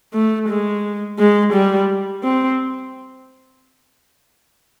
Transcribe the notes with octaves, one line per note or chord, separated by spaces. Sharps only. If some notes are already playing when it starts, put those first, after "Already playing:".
A3
G#3
G#3
G3
C4